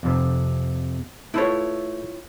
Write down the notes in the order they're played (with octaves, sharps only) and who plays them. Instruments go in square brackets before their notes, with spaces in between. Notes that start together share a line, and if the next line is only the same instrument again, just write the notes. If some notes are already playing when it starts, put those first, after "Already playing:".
[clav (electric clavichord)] F2 C3
[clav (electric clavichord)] A3 B4 A5 [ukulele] E4 F4 C#5